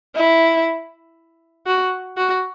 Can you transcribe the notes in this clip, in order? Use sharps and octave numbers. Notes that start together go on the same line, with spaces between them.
E4
F#4
F#4